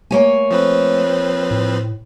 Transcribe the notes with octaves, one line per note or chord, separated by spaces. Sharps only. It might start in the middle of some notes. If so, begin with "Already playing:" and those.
A3 A#3 C#5 G#5
F3 C4 B4
A2